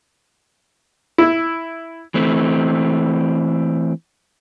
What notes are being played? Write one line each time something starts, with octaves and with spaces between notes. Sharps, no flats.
E4
E3 A3 C4